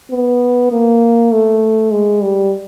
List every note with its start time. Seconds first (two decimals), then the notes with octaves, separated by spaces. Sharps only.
0.11 B3
0.72 A#3
1.32 A3
1.92 G#3
2.22 G3